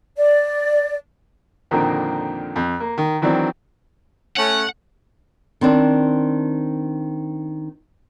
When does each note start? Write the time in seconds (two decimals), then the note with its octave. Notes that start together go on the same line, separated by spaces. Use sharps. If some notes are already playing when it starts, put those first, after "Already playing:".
0.16 D5
1.71 F2 A#2 D3 D#3 A#3 C4
2.56 F2
2.80 A#3
2.98 D#3
3.22 D#3 E3 F#3 C4 D4
4.37 A3 C#4 F#5
5.61 D#3 C4 D4